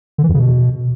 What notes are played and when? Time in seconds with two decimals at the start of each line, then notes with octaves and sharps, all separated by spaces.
0.18 D3
0.24 E3
0.29 F2
0.34 C#3
0.40 B2